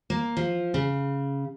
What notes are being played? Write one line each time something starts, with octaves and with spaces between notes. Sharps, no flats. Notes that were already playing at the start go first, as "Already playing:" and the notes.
A#3
F3
C#3